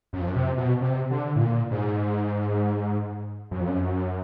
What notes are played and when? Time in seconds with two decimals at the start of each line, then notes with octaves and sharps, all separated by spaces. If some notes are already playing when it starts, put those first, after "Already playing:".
0.13 F#2
0.20 F2
0.28 F#2
0.36 C3
0.58 B2
0.81 C3
1.11 D3
1.36 A2
1.40 A#2
1.71 G#2
3.51 F#2
3.60 F2
3.67 F#2